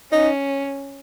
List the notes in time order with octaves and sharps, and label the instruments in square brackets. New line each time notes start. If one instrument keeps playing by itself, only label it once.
[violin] C#4 [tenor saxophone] D#4